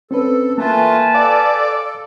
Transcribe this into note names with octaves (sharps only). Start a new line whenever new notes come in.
C4 C#4 A4 B4
E3 A3 A#3 F4 B4 G#5 A5
A4 D5 F5